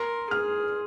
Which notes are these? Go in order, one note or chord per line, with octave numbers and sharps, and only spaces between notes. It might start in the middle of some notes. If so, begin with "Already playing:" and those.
Already playing: A#4 C6
G#4 F6